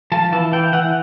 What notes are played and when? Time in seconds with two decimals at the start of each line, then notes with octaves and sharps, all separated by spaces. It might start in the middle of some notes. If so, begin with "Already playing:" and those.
0.12 F3 A5
0.32 E3 A5
0.52 E3 G5
0.73 E3 F#5